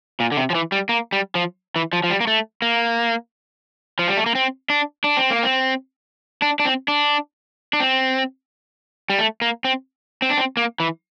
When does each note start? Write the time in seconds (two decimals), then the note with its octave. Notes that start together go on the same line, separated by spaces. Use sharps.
0.20 A#2
0.32 D3
0.37 C3
0.50 F3
0.55 E3
0.72 G3
0.89 A#3
1.13 G3
1.35 F3
1.76 E3
1.93 F3
2.04 F3
2.10 G3
2.21 A#3
2.27 A3
2.62 A#3
3.99 F3
4.08 G3
4.17 A3
4.26 A#3
4.35 C4
4.70 D4
5.04 D4
5.17 C4
5.30 A#3
5.43 C4
6.42 D4
6.60 D4
6.65 C4
6.88 D4
7.73 D4
7.80 C4
9.10 G3
9.19 A3
9.42 A#3
9.65 C4
10.22 C4
10.30 D4
10.37 C4
10.57 A#3
10.80 E3